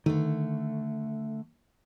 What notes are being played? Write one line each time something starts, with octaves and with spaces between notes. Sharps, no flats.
D3 D#3 A3